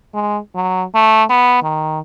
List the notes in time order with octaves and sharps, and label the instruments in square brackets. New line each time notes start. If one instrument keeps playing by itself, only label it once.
[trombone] G#3
F#3
A3
B3
D#3